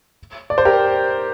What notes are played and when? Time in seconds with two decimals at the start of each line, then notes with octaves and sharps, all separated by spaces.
0.50 D5
0.58 C5
0.65 G4 A#4